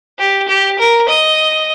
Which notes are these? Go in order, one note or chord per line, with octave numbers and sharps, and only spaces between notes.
G4
G4
A#4
D#5